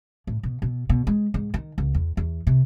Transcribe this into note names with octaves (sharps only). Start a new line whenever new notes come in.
A2
B2
B2
B2
G#3
G#2
D#3
C#2
E2
E2
C3